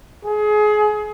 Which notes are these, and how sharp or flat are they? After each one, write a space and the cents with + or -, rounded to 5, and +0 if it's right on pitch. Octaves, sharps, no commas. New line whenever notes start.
G#4 +25